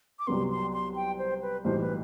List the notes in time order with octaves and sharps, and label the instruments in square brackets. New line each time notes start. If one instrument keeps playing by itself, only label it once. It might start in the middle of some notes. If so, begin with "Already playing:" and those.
[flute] D6
[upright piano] C2 C3 F#3 B3 [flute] C6
[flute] C6
C6
G5
C5
B4
[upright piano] B1 A2 E3 G3 [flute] C5
[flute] B4